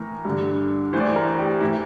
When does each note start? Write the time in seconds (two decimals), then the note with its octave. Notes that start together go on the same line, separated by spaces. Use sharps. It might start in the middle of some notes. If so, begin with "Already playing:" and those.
Already playing: A2 E3 A#4
0.25 G2 D3
0.93 E3 C5
0.96 A2 D5
1.07 C5
1.16 A#4
1.39 G4
1.61 A2 E3 E4